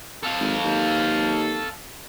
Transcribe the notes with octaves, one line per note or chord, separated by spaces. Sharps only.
A4 F5
G#1
D#2